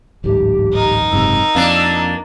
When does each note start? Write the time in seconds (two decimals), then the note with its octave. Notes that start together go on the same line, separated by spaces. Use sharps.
0.24 D1 A1 G#2 G4
0.73 D#4 A#4
1.11 F#1 G#2 C3 E6
1.55 F2 A#3 D4